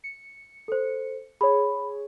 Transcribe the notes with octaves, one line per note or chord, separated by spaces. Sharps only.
C#7
A4 C5
G#4 C#5 B5